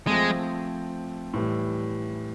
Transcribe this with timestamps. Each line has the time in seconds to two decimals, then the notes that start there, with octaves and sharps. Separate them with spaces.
0.07 F3 G#3 A3 C4
1.34 A2 E3 G3